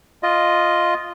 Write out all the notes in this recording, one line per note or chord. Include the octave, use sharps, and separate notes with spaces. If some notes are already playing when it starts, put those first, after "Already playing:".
F4 D#5